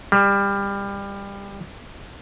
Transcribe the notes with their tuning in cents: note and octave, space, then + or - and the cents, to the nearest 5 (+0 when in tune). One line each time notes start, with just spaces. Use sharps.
G3 +25